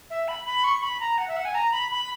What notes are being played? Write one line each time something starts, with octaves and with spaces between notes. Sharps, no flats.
E5
B5
B5
C#6
B5
A#5
F#5
E5
F#5
G#5
A#5
B5
B5